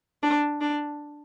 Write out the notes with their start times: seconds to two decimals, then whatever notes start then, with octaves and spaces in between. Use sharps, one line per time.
0.23 D4
0.61 D4